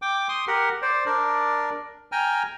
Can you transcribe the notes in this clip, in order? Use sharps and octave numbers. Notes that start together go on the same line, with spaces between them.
G5 D6
C6 D#6
G4 A#4 F#5
C5 D5
D4 A#4 D5
G5 G#5 A#5 F6